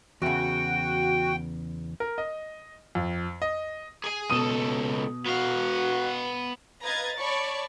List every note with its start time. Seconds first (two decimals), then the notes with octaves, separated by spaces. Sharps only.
0.22 E2 C#3 F#4 G5
2.00 A#4
2.18 D#5
2.95 F2
3.42 D#5
4.04 G#4 G#5
4.30 C#2 B2 A4 D#6 D#7
5.26 B3 F#4 F5
6.83 B4 D#5 F5 A#5 G#6 A6
7.20 C#5 D5 A5 B5 C#6